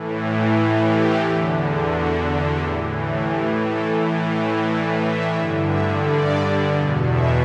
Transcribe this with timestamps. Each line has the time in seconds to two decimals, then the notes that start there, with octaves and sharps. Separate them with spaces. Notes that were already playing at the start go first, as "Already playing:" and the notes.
Already playing: A2 E3
0.53 A4
0.88 G4
1.22 E2 D3
1.90 F#4
2.59 A2 E3 G4
3.29 G4
3.64 A4
3.98 A2 E3
4.33 E5
4.67 D5
5.02 E5
5.36 G2 D3
5.70 E5
6.06 D5
6.74 E2 B2
7.09 E5